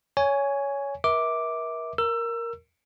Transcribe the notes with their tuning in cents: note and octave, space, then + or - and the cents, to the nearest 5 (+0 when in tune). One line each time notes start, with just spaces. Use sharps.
C#5 +15 G#5 +0
A#4 +40 E5 -30 D6 +0
A#4 +0 E6 +25